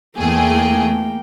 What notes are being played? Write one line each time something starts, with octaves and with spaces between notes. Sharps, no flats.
E2 A3 A#3 G#4 G5